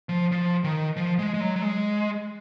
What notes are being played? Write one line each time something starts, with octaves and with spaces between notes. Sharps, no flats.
F3
F3
D#3
F3
G#3
G#3
F#3
F#3
G#3